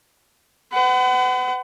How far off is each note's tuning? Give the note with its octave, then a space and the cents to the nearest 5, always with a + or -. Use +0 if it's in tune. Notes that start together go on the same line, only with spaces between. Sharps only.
B4 +45 F#5 +25